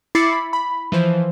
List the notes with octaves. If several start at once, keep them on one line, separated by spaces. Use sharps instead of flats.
E4 B5 D6 A6 C7 C#7
B5
B5
E3 F3 C5